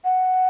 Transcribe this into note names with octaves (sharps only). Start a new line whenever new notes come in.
F#5